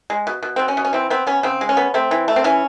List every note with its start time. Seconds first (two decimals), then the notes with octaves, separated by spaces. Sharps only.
0.10 G#3
0.27 B2
0.43 B2
0.56 B2 C4
0.68 C#4
0.77 B2
0.85 C#4
0.93 E3 C4
1.10 B3 C4
1.27 B3 C#4
1.43 C#3 C4
1.61 G#3
1.69 C#4
1.77 B3
1.94 A3 C4
2.11 E3
2.28 A3
2.36 C4
2.44 E3 C#4